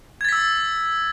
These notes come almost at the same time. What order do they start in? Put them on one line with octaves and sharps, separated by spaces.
G#6 A6 B6 E6